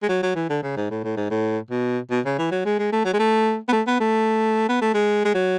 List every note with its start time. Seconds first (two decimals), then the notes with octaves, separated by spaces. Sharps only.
0.03 G#3
0.09 F#3
0.23 F#3
0.36 E3
0.50 D3
0.63 C#3
0.77 G#2
0.90 A2
1.03 A2
1.17 G#2
1.30 A2
1.70 B2
2.11 B2
2.25 C#3
2.39 E3
2.51 F#3
2.65 G#3
2.79 G#3
2.92 A3
3.05 F#3
3.13 G#3
3.19 A3
3.68 B3
3.72 A3
3.87 B3
4.00 A3
4.69 B3
4.81 A3
4.94 G#3
5.25 G#3
5.34 F#3